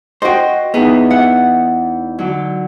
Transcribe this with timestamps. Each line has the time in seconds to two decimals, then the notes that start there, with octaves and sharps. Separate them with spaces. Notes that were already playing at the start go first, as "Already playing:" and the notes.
0.22 F#4 C5 D#5 G5
0.74 E2 B3 D#4 G#4 E5
1.11 F#5
2.19 D3 F#3